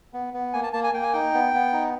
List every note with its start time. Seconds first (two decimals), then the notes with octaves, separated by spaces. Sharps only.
0.13 B3
0.34 B3
0.53 A#3 G#5
0.63 A5
0.73 A#3 A5
0.84 G#5
0.93 A#3 G5
1.03 G#5
1.13 D#4 G5
1.34 B3
1.54 B3
1.73 D#4